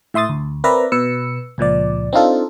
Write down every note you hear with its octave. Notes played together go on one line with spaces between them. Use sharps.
A2 E5 C6 D#6 A6
D2
C4 A#4 B4 D5 E5 A#5
B2 B4 E6 C#7
C#2 A#2 F3 D5
C4 D4 D#4 F4 A4